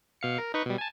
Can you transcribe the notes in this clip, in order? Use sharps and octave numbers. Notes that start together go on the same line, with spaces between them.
B2 F5 C#7
A#4
D#4 B4 C#6
B2 G3
G#5 A5